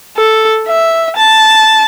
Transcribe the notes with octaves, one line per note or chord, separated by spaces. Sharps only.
A4
E5
A5